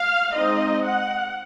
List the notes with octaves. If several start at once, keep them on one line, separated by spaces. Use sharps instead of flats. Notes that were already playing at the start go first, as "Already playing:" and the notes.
Already playing: F5
G#3 C4 D#4 D#5
F#5